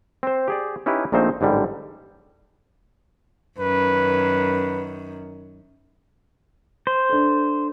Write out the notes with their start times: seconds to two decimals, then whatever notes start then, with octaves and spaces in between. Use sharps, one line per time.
0.23 C4 C5
0.48 G4 G#4 D5
0.86 C#4 D#4 E4 G4 B4
1.12 A#1 A#2 A3 C4 D#4 C5
1.41 A1 G#2 D3 G3
3.59 F#2 D#3 B4
6.87 C5
7.09 D4 A4